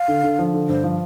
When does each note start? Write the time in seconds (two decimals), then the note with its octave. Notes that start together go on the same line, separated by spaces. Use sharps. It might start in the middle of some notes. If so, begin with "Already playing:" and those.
Already playing: F5
0.08 D3
0.23 D3
0.39 F3
0.54 D3
0.69 G2 C5
0.84 F3